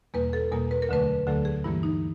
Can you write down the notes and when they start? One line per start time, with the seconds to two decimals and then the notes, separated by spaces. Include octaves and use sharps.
0.14 E2 B2 G3 A#3 B4
0.33 A4
0.52 E2 B2 G3 A#3 A#4
0.71 B4
0.82 A#4
0.89 D2 D3 F#3 A3 B4
1.27 D2 D3 F#3 A3 A4
1.45 G#4
1.64 G2 E3 G3 A#3 E4
1.83 D#4